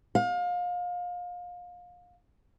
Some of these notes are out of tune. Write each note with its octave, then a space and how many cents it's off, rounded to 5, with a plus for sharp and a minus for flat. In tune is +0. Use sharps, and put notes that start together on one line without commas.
F5 +30